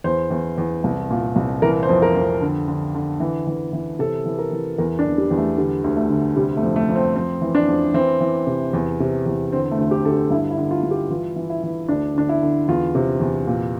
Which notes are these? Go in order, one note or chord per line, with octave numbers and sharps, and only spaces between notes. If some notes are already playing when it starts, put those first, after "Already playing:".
E2 C5
E2
E2
C2
A#2
C2
E3 A#4
C5
F2
A#4
F2
D3
D3
D3
E3
E3
E3
C3 A4
E3
A#4
E3
E2 A#4
D4
E2
G3
E2
A3
D3 G3
D2
A3
D3
C3 G3
A3
F2
A3
F2
C4
F2 C4
E3
D4
F2
E3 C4
E3
C3
E2
C3
E2
D3 C4
A3
D2
G4
D3 A4
G4
G2 E4
E4
D3
F4
G2
G4
E3 F4
E3
E4
E3
D2 D4
D3 D4
E4
D3
E2 F4
C3
E2
A#2